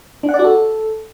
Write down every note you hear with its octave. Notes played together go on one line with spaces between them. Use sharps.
D4
F#5
D5
F#4
A4